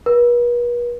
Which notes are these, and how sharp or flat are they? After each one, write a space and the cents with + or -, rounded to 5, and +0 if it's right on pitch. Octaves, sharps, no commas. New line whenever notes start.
B4 -45